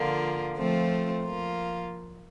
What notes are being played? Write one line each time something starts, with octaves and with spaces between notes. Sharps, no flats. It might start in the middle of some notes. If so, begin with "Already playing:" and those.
Already playing: D3 F3 A#3 F4
F3 A3 C4 F4
F3 A#3 F4